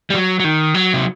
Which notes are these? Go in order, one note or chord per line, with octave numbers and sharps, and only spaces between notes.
G3
F#3
F#3
D#3
F#3
C3